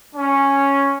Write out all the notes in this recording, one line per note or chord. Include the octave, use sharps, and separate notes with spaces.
C#4